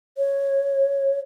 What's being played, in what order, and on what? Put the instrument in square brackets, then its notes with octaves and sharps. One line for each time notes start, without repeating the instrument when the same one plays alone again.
[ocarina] C#5